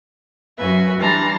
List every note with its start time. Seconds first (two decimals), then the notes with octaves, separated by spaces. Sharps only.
0.59 F#2 F#4 B4 E5 G#5
0.98 E3 G3 D4 A5 A#5 C6